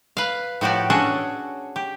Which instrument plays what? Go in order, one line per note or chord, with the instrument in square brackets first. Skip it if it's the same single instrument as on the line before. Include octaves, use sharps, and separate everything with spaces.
[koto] B4 F5
A2 F3 F#4 G4 D5
C#4 D4 F#4 G#4 A4
G4